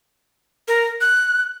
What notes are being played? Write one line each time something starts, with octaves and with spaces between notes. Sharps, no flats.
A#4
F#6